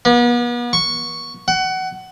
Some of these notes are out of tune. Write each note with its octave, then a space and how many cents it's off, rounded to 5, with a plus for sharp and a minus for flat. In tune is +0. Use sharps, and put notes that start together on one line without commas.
B3 -40
C#6 +0
F#5 +20